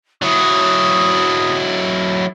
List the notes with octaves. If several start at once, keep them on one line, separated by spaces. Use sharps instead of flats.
F#3 E4 D#6